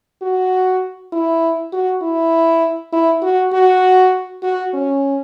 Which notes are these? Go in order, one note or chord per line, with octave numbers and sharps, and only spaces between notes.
F#4
E4
F#4
E4
E4
F#4
F#4
F#4
C#4